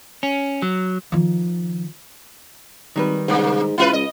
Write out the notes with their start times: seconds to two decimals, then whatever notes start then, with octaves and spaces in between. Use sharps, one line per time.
0.23 C#4
0.62 F#3
1.12 D#3 F3
2.96 G#1 D#3 G3 B4
3.28 G#2 C3 A#3
3.78 C#2 E4 F4 B4
3.93 C#2 D#5